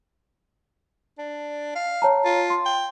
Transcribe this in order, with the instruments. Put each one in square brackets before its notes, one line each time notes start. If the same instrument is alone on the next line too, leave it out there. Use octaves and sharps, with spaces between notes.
[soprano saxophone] D4
F5
[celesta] C#5 A5 A#5
[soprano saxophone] F4
[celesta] C6
[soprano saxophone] G5